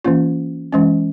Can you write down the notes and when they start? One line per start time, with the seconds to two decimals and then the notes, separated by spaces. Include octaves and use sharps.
0.04 E3 A#3 C#4 F4
0.72 E3 G#3 C#4